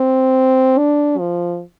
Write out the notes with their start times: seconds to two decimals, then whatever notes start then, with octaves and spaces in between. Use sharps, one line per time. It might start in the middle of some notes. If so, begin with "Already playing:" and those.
Already playing: C4
0.78 D4
1.19 F3